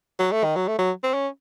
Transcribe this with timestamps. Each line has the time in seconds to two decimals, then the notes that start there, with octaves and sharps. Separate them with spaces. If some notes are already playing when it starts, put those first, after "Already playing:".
0.19 F#3
0.32 A3
0.44 D#3
0.56 F#3
0.68 A3
0.78 F#3
1.03 C4
1.14 C#4